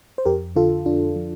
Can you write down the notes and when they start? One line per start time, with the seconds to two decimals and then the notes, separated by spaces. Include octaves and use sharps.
0.18 C5
0.25 F2 G4 A#4
0.56 D3 F4 A4
0.86 F2 D4 F4
1.16 F3